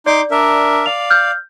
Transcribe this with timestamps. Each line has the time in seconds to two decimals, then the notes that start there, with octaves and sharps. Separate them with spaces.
0.06 D#4 D5 C6 D6
0.31 D4 A#4 E5
0.86 D5 F5 F7
1.10 F6 G6